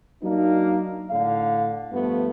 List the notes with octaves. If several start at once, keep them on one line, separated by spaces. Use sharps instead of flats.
F#3 A#3 D4 D#4
A2 D3 F5
G2 F3 A3 B3